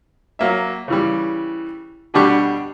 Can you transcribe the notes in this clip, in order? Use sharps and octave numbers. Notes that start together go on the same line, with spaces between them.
F#3 A#3 E5
C#3 E3 G3
B2 D3 G3 D4 G4 C#6